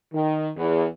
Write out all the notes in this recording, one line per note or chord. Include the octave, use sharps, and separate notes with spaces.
D#3
E2